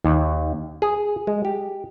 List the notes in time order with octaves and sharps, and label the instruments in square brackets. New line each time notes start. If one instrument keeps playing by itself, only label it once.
[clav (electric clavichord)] D#2
G#4
G#3
G4